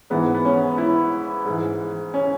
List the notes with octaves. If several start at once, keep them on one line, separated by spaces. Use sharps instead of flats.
G#2 E3 B3
B3
C#4
E4
G#2 E3
C#4